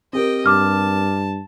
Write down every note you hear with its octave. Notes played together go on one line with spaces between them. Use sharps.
C4 G4 A#4 D#5 G5
G2 A5 D6 F6